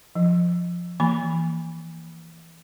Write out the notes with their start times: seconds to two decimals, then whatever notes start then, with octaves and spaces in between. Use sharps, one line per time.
0.15 F3
1.00 E3 A#3 B5